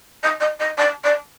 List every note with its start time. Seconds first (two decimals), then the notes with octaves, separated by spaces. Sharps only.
0.23 D#5
0.40 D#5
0.60 D#5
0.78 D5
1.04 D5